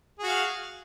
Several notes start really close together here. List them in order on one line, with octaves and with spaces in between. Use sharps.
G#4 F#4 F5